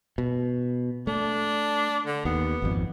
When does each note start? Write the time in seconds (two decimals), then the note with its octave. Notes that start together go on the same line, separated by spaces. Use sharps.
0.18 B2
1.07 A3 D4
2.06 D3
2.25 D#2 B3
2.62 G#1 F2